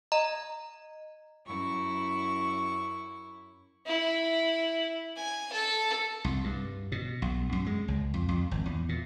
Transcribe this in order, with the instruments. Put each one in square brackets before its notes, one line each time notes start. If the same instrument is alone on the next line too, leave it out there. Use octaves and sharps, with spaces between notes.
[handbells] D#5 A#5
[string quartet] F#2 E4 C#6
[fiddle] E4
G#5
A4
[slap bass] C2
G2
B2
B1
F#2
G#3
C#2
F2
F2
G#1
E2
A#2